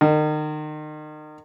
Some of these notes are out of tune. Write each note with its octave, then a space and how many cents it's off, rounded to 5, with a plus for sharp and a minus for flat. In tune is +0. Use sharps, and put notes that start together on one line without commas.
D#3 -35